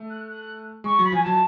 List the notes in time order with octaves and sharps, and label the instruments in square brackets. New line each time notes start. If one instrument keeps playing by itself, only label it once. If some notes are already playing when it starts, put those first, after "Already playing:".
Already playing: [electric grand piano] A3
[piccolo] F#6
F#6
[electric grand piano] G#3 [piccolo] C#6
[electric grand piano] F#3 [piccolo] B5
[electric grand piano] F3 [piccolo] G#5
[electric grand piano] F#3 [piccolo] A5